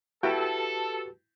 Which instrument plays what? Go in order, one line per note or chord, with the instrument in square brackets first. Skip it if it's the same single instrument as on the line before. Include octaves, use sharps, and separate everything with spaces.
[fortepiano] E4 G5 [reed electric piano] F#4 G4 B4 [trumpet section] A4